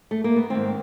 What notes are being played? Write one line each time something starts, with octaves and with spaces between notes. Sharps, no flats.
A3
A#3
B3
G#2 D#3 C4